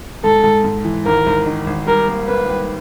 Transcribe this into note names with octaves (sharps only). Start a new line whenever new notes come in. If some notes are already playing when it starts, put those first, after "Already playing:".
G#2 A4
G#2
G#2
E3
G#1 A#4
G#1
D#3
G#1
G3 A#4
A#3
A#3 B4
G3